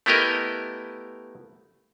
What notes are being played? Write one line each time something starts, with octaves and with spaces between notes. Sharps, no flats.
A3 B3 E4 G4 A#4 D#5